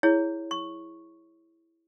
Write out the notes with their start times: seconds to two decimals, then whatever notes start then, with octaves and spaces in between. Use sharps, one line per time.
0.03 E4 G#4 C#5
0.51 C#6